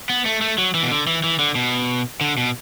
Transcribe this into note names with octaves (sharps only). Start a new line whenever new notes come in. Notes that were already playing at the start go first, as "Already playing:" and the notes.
B3
A3
A3
F#3
E3
B2
D3
E3
E3
D3
B2
D3
B2